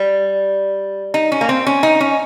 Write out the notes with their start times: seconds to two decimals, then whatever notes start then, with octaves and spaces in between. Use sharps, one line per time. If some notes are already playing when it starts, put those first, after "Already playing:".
Already playing: G3
1.14 D#4
1.32 C#4
1.41 A#3
1.49 C4
1.66 C#4
1.83 D#4
2.00 C#4